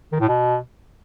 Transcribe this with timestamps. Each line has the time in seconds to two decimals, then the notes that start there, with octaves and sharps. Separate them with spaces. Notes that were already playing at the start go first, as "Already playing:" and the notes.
0.12 D#3
0.20 A2
0.28 B2